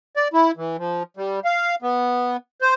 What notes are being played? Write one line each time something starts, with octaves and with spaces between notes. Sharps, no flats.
D5
E4
E3
F3
G3
F5
B3
C5